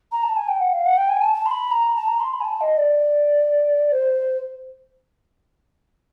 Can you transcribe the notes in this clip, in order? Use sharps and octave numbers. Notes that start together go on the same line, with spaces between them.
A#5
A5
G#5
G5
F#5
F5
F#5
G5
G#5
A5
A5
C6
B5
A#5
A5
A#5
C6
B5
G#5
A5
D#5
D5
C5